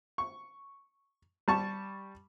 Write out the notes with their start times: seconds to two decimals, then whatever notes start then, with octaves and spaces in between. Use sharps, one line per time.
0.18 C#6
1.48 G3 A5 C#6